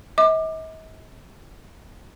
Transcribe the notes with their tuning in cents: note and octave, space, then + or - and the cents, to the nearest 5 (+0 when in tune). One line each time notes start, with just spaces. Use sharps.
D#5 +45 D6 +25